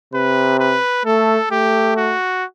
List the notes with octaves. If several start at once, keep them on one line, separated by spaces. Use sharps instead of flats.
C3 B4
B4
A3 A4
A3 G4
F#4